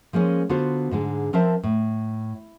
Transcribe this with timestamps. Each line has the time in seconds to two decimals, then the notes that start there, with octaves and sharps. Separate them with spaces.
0.13 F3 G#3 A#3 C#4
0.49 D3 B3 F4 F#4 C5
0.91 G#2 D3 G#3
1.33 F3 C4 A#4 C5 E5 A5
1.63 A2